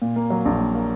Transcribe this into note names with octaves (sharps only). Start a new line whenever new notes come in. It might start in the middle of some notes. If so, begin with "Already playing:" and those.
A#2
A#3
F#3
A#1
A#2
A#3